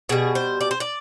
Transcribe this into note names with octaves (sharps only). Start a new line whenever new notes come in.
B2 G3 G#4
C5
D5
C5
D5